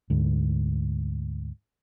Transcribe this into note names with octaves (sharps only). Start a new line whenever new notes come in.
D2 G#2